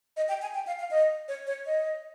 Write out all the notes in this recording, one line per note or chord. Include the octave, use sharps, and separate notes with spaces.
D#5
G5
G#5
G5
F5
F5
D#5
C#5
C#5
D#5